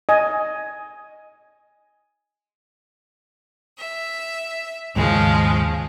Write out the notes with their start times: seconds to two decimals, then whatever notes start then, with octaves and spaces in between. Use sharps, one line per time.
0.09 D#5 G#5
3.79 E5
4.96 D#2 G#2 C#3 F3 G#3